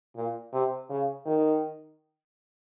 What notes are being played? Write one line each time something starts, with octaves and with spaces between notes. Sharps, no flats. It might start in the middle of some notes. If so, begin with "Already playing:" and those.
A#2
C3
C#3
D#3